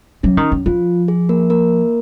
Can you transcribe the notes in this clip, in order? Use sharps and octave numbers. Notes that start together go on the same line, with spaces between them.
F#3 C#4
D#3
F#2
F3 F4
G#4
A#3 A#4
A#3 A#4